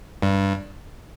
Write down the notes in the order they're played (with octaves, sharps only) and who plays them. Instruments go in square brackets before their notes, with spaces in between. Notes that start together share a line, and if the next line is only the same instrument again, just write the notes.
[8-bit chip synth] G2